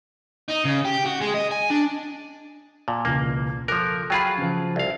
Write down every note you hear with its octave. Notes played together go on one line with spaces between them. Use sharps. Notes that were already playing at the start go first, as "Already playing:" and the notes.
D#4
C#3
G4
F#4
G#3
D#5
G#5
D4
A#2 A5
E1 C#2 A#3
F3 A4 A#4 D6 F#6
F#3 F4 G#4 G5 B5
C#3 F3
C2 E5 F5